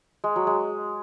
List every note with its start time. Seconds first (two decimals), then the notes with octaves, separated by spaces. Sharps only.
0.24 G#3
0.36 F#3
0.47 G#3